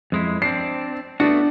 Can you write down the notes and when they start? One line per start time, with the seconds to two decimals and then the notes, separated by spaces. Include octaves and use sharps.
0.12 F2 G#3 E4
0.42 C4 D4 C7
1.20 A3 B3 D4 F#4